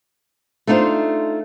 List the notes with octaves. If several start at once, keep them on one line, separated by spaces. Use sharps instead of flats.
A3 D4 D#4 F4 C5